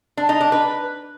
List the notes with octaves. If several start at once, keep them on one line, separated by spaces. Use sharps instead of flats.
D4
D#4
D4
B4